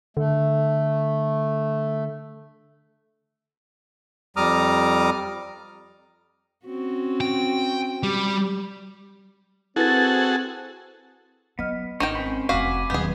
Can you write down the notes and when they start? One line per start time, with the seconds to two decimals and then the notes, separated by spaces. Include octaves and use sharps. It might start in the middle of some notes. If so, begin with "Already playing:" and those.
0.17 D3 A3
4.37 F2 G3 A#5 D6 D#6 F6
6.65 C4 C#4 F#4
7.21 G5
8.03 G3
9.76 C4 E4 F#4 G#4 A4 B4 A6
11.59 F#3 B3 D#5 F6
12.00 G#1 D#3 D#4 G5 C#6
12.15 C4 C#4 C5 B5
12.49 F1 E2 F#4 F5 G#5 B5 D6
12.90 D#1 D#2 D#3 F#3 B3 G#4 B4